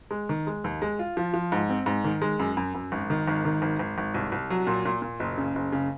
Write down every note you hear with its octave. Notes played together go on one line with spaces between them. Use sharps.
G#3
D#3
G#3
D#2
G#3
F4
F3
F3
G#2
C4
G#2
D#3
G#3
F#2
F#2
F#2
G#1
D#3
G#1
D#3
G#1
G#1
G#1
C2
C2
F#3
A#2
A#2
A#2
F#1
C#3
F#1
C#3